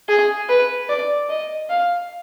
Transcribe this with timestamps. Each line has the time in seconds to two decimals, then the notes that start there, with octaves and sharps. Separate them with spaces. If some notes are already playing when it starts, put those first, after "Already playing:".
0.09 G#4
0.49 B4
0.89 D5
1.29 D#5
1.70 F5